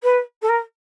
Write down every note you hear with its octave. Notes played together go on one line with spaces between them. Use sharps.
B4
A4
A#4